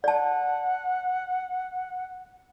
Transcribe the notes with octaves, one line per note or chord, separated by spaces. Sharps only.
D5 F#5 A5